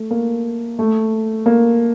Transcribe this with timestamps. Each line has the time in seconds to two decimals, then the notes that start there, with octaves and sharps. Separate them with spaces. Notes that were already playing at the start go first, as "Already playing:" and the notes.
Already playing: A3
0.11 A#3
0.79 A3
1.46 A#3